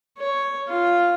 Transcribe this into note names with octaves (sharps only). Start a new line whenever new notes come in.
C#5
F4